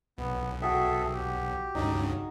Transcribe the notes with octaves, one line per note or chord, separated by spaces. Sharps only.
B1 B3
F#4 G#4 A4 E5 G5
G4
C#2 G2 C#3 D#4